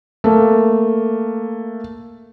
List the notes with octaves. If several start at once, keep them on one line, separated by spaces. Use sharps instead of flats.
A3 A#3